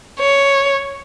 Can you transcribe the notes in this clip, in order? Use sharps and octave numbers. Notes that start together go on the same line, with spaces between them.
C#5